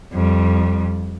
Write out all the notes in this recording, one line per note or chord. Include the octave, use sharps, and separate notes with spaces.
F2 G3